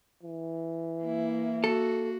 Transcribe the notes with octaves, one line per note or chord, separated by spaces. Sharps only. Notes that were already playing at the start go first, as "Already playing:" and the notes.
E3
A#3 E4
F#4 A4